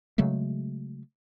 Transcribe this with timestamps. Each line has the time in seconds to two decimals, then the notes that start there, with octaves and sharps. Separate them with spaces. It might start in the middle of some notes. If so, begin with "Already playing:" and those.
0.18 C#3 F#3 G#3 A3